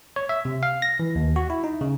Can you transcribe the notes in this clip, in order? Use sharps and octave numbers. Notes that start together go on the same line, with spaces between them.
C#5
E5
C3
F5
A#6
E3
D#2
F#4
E4
D#4
C#3